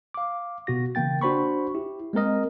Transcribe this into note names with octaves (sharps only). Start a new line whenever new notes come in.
F5 D6
B2 F#4 A#6
C#3 E3 A#3 G5 A6
D4 F#4 C5 B5 C#6
E4 G4
G#3 A#3 C4 A#4 D#5